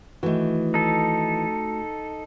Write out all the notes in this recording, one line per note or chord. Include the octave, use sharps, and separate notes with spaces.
D#3 E3 A3 F#4
D#4 A4